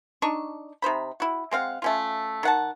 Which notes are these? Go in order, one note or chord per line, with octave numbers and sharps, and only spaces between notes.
D4 D#4 C#6
C3 D#4 C5 B5
E4 F#4
G#3 C4 F5 F#5
A3 C#4 F4
D#3 F#5 A5